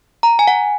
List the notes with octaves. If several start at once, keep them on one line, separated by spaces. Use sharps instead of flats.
A#5
G#5
F#5